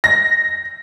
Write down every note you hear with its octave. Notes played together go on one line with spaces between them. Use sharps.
A#6